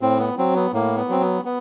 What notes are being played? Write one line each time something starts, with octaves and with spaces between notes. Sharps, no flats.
A2 C4
B3
F#3 C4
B3
A2 A#3
B3
F#3 C4
B3
B3